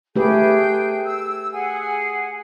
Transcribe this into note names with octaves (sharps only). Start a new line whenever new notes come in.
A3 G4 G#4 B4 G5 G6
E6
G#4 F#5 G#5